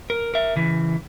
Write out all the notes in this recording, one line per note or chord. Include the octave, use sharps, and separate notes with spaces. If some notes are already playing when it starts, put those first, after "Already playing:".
A#4
A#4 E5
C#3 E3